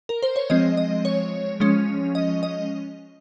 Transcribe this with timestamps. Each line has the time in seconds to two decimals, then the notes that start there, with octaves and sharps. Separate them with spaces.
0.09 A#4
0.23 C5
0.36 C#5
0.50 F3 G#3 C4 D#5
0.77 D#5
1.05 C#5
1.60 F3 G#3 C#4
2.15 D#5
2.43 D#5